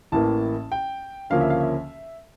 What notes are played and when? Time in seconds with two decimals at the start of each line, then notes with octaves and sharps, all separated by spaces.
0.12 A1 A2 E3 A#3 A5
0.72 G5
1.30 D2 C#3 F3 A#3 C#4 F5
1.41 E5
1.50 F5
1.60 E5